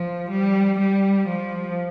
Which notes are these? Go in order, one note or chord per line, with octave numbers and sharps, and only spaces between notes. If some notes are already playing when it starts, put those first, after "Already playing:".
Already playing: F3
G3
G3
F3